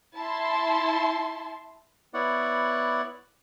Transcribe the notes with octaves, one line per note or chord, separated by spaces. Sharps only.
E4 A5 C6
B3 E4 C#5 D5 F#5